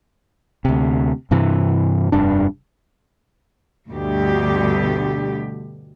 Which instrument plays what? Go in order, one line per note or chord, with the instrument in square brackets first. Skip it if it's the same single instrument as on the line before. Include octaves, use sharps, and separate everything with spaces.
[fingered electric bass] D2 C3
G2 C3 E3
F1 G2 D4
[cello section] D2 G2 B2 D3 G4